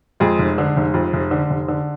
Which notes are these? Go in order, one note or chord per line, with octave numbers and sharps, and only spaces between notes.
F2 G#3 G#4
F1
D3
F1
F2
F1
D3
F1
D3